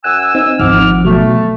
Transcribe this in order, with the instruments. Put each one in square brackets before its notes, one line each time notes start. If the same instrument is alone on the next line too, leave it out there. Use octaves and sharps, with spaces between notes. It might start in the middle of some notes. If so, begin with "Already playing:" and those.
[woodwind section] F#2 G#5 E6 [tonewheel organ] F#5
[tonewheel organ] C4 D#4
[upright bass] G#1 F3 [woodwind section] F#5 D6 F6
[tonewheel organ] B2 F#3 [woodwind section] A3